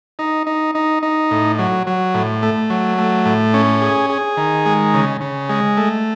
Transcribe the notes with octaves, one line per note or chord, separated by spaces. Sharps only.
D#4
D#4
D#4
D#4
A2
F#3
F#3
A2
A3
F#3
A3
A2
C#4
G#4
G#4
D#3
G#3
C#3
C#3
G#3
A3